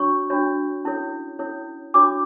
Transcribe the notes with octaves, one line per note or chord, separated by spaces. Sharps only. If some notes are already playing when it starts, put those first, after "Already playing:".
Already playing: D4 F#4 C#5 C#6
D4 F#4 C#5
C#4 E4 A4 C#5
C#4 E4 A4 C#5
D4 F#4 C#5 D6